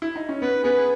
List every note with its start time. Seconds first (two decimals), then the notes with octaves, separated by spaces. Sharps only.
0.02 E4
0.16 D#4
0.29 C#4
0.42 B3 B4
0.64 B3 G#4 B4
0.77 G#4